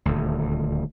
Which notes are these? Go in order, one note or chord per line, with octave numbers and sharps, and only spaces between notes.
D#1 D2